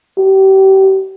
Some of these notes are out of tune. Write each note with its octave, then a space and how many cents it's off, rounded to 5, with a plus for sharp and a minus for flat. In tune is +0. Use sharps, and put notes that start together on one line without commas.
G4 -30